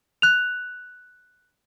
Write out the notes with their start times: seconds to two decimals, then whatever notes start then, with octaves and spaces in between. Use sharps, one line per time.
0.22 F#6 F7